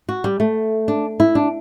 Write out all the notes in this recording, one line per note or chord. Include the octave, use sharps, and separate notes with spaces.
F#4
G3
A3
D4
E4
D4